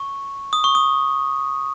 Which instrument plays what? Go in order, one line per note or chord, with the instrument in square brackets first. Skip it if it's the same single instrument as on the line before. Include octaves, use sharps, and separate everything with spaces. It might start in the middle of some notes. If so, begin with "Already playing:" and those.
Already playing: [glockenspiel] C#6
D#6
C#6
D#6